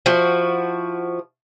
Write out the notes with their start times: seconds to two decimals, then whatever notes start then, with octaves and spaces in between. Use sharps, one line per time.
0.06 F3 E4 F#4